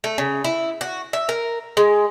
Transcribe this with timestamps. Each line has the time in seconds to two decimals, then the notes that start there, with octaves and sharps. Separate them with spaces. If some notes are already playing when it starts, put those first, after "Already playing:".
0.04 A3
0.18 C#3
0.44 E4
0.81 F#4
1.13 E5
1.29 A#4
1.77 G#3